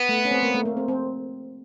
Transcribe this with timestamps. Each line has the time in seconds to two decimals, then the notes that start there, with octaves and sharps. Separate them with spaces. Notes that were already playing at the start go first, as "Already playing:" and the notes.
Already playing: B3
0.09 A3
0.25 C#4
0.31 C4
0.43 A#3
0.54 A3
0.65 A#3
0.77 C4
0.88 C4